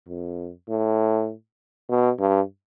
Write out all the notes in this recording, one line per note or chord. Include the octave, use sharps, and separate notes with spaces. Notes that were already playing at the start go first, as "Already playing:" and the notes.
F2
A2
B2
G2